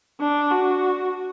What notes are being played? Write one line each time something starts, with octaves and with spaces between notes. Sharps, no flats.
D4
F#4